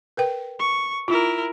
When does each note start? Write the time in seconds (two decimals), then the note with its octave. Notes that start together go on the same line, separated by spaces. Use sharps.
0.17 A#4 B4 G5
0.59 C#6
1.08 E4 F4 A#4